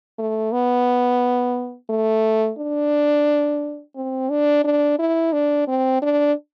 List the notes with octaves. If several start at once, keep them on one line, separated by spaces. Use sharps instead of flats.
A3
B3
A3
D4
C4
D4
D4
E4
D4
C4
D4